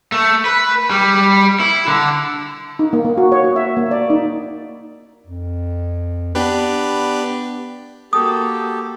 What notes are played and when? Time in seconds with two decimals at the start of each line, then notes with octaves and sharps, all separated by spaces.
0.12 A3
0.45 B4
0.90 G3
1.60 E4
1.88 D3
2.79 D#4
2.93 A#3
3.05 A#3
3.18 F#4
3.32 C#5
3.44 F#4
3.56 E5
3.77 A#3
3.91 D5
4.10 D#4
5.27 F2
6.35 B3 D4 G4 B4
8.13 A#3 F#4 G4 A4 D#6